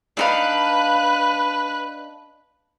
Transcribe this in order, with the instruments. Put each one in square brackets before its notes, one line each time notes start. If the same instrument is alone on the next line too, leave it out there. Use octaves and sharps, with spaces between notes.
[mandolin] D4 D#4 F5 [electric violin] B4 F#6